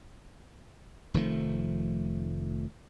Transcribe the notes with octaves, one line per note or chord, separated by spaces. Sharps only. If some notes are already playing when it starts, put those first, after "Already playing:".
F1 D#3 F3 A3